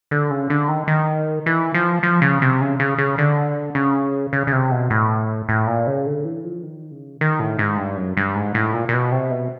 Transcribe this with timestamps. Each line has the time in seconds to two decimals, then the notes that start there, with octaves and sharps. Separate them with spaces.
0.11 D3
0.31 C#3
0.50 D3
0.68 D#3
0.88 D#3
1.46 E3
1.74 F3
2.03 F3
2.22 C#3
2.42 C3
2.61 C#3
2.80 C#3
2.98 C#3
3.18 D3
3.75 C#3
4.33 C#3
4.47 C#3
4.53 C3
4.72 B2
4.90 A2
5.49 A2
5.67 A#2
5.87 C#3
6.06 D3
6.25 E3
6.44 F3
6.63 D#3
6.91 C#3
7.21 D#3
7.40 A2
7.59 G#2
7.78 G2
7.97 F#2
8.17 G2
8.35 G#2
8.55 A2
8.73 A#2
8.89 A#2
8.94 B2
9.12 C3
9.31 B2